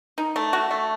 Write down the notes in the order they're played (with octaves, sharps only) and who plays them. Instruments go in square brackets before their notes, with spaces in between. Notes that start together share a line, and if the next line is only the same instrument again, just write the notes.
[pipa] D#4
A3
F#4
A3